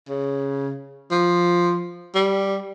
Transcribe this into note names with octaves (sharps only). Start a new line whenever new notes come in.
C#3
F3
G3